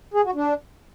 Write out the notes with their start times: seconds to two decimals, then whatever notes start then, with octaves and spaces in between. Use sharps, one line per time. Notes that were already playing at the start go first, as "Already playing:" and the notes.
0.14 G#4
0.24 F#4
0.35 D4